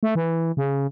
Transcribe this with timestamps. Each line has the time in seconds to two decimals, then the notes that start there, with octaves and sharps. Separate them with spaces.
0.03 A3
0.15 E3
0.57 C#3